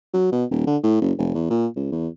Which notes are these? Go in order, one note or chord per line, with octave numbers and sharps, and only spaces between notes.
F#3
B2
D#1
D3
A2
F#1
F1
E2
A#2
C#2
E2